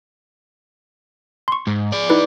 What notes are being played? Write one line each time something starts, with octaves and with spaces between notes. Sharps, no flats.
C6 C#6
G#2
G#4 D5
D#4 E4 B4